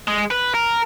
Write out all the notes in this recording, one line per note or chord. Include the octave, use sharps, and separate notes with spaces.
G#3
B4
A#4